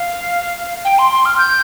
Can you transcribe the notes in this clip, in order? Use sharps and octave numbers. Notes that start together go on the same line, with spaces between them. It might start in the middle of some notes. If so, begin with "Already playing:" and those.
Already playing: F5
G5
C6
C6
F6
G6